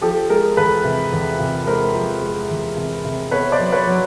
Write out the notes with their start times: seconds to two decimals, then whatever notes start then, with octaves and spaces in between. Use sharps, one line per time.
0.01 F3 G4 A4
0.29 G#3 G#4 A#4
0.56 E2 A4 B4
0.84 C3
1.13 E2
1.39 C3
1.67 G#3 A#4 C5
1.95 F3
2.22 G#3
2.50 E2
2.77 C3
3.05 C3
3.31 B3 B4 C#5
3.52 C5 D5
3.59 F#3
3.72 B4 C#5
3.87 F#3